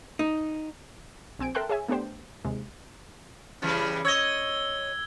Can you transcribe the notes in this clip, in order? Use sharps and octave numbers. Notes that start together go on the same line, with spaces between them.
D#4
A#1 C4 G#5 D7
A4 A#4 E5 G5 C6 F#6
G#4 C#5 E5 G#5
A3 B3 D4 G4 C5 G5
D#2 C3 G#3
C#3 E3 G3
C#5 D#5 E6 G#6 G7